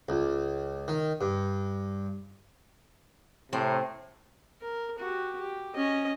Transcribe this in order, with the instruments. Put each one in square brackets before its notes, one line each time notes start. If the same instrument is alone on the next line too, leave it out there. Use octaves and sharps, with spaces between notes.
[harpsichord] C#2
D#3
G2
[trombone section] A2 C3 [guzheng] C4
[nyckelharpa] A#4
F#4 G4
G4
C#4 D#5